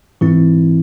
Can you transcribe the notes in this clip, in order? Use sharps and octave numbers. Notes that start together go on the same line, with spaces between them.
G#2 E3 C4 E4